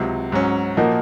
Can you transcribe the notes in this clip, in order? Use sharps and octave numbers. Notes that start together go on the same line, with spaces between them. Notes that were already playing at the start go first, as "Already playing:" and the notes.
Already playing: C#2 C3 F#3
G#2 F#3 C#4
A#2 F3 A#3 D#4 F#4